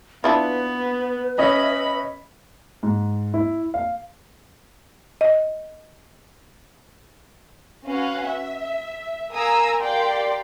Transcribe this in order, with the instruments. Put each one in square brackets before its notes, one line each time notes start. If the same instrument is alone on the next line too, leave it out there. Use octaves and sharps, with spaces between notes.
[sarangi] B3 [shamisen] D4 E4 F4 [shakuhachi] B4
[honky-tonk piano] C#4 D#5 E5 [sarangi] B5
[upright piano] G#2
E4
F5
[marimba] D#5
[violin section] C#4 F#4 B4 F5 F#5
E5
A#4 F5 G#5 A#5 D#6 E6
G4 A#4 D5 F5 G5 C6